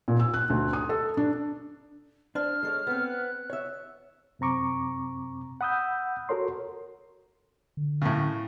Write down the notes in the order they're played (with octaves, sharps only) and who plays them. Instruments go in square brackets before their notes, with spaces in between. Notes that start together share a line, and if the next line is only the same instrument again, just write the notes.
[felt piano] A#2
E6
F#6
D2
D#6
A4
D4
[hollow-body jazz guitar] D4 C5 [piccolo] F6
[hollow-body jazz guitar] G#3 A4 C#5
B3 C4
[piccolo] F#6
[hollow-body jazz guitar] C#5 E5
[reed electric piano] F#2 C3 C4 A#5 C#6 D6
F#5 B5 D#6 E6 G6
F#4 A4 A#4 C#5 C6
[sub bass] D3
[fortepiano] A2 C#3